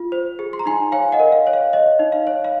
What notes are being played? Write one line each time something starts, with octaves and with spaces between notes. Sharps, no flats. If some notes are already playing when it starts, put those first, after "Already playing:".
Already playing: F4
C5
G#4
C6
A#5
D#4 G#5 C6
C#5 F5 G#5
D#5 F#5
A#4
F5
C#5
F5
C#5 D#5
D#4
F5
C#5
F5